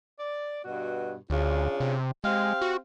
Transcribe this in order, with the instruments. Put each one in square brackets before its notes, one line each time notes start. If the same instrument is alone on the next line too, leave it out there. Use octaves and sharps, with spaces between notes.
[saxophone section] D5
G2 B2 F#4
[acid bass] D2 [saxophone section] C#3 D4 F4
[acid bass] C3
[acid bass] G#3 [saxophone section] C4 G4 F5
[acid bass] F#4